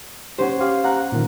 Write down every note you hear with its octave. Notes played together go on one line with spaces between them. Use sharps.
C#4 G4 C5 F#5
G4 F5
F#5 A#5 F#6
A#2 D3 D#3